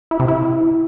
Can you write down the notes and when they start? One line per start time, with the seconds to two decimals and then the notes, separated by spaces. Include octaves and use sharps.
0.11 E4
0.20 C3
0.28 E4